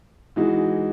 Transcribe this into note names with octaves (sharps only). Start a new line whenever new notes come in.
E3 G#3 D#4 F#4